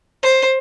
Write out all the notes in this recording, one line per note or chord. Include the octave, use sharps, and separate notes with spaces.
C5